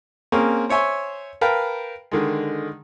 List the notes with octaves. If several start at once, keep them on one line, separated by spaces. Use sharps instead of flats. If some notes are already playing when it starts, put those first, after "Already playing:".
A#3 C4 C#4 G#4 A#4
C5 C#5 E5 G#5 C6
A#4 B4 F5 G5 A5
D3 D#3 G#3